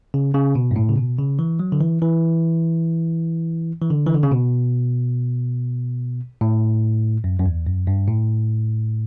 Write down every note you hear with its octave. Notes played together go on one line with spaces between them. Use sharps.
C#3
C#3
B2
G2
A2
C#3
B2
C#3
E3
F#3
D3
E3
E3
E3
D3
E3
D3
C#3
B2
A2
F#2
F#2
E2
F#2
G2
A2